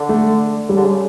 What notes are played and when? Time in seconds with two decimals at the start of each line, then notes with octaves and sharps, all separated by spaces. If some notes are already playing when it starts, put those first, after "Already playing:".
Already playing: D3
0.09 A3
0.68 C#3 G3
0.76 D3
0.85 C#3